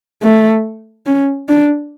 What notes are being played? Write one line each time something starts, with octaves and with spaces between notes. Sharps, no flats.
A3
C#4
D4